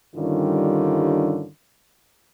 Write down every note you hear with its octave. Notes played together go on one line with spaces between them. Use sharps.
G2 D3 D#3 G3 C#4 F4